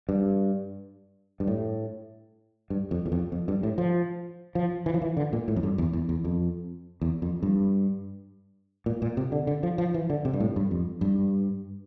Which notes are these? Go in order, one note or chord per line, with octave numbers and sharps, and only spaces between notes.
G2
G2
A2
G2
F2
E2
F2
F2
G2
A2
F3
F3
E3
F3
E3
D3
A#2
A2
F2
G2
E2
E2
E2
F2
E2
F2
G2
A#2
A#2
C3
D3
D3
F3
F3
E3
D3
C3
G2
A2
G2
F2
G2